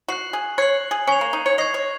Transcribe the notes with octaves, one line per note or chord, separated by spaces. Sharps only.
F#4 F#6 C7 F#7
G#4
C#5 F#6 C7 F#7
G#4
C#4 C#6 G#6 C7 F7
A#3
D#4
C#5
D#5 C#6 G#6 C7 F7
C#5